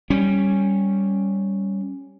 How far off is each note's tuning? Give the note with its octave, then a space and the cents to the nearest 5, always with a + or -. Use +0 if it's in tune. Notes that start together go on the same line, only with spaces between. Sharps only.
G3 +0 C#4 -5